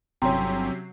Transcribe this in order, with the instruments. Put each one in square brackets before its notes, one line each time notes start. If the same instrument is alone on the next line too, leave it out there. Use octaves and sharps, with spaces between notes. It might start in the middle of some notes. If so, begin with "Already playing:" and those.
[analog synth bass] G1 [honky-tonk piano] C3 C#4 [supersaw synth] F#3 C7 [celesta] G5 A#5 C6